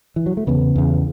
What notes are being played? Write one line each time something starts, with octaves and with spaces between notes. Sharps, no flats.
E3
F#3
A3
E2 C#3 B3
E2 C#3